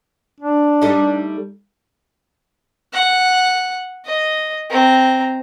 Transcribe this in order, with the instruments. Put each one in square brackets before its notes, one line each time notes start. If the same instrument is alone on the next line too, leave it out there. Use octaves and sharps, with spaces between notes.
[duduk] D4
[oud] G3 A3 D#4
[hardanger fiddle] F#5
D#5
C4 A#5